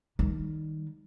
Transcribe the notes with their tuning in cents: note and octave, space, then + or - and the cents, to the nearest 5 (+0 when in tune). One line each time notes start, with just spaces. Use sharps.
D#3 +0 G3 +0